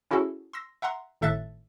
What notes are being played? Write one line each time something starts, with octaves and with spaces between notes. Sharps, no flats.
C#4 E4 F#4 G#4 A4
C6 E6 A#6
E5 F#5 A#5 C6
G#1 A2 A4 E5 F#6 A6